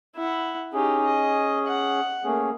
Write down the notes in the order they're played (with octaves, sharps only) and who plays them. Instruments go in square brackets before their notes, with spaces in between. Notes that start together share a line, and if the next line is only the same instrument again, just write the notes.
[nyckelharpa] E4 F#5
[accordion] C#4 G#4 [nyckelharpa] D#4 G4
[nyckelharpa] D#5
F#5
[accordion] A3 C#4 G#4 [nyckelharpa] A#3